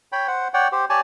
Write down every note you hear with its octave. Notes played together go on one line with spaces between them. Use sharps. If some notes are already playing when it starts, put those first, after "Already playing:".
C#5 G5 B5
C5 F#5
C#5 D5 F#5 G5
G4 C5
G4 C#5 D5 G#5 A5